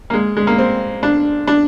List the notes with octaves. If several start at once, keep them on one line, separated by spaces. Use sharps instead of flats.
A#3
G#3
G#3
A#3
C4
D4
D4